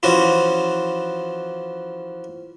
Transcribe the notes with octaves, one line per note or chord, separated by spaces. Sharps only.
E3 F3 C#4 F#4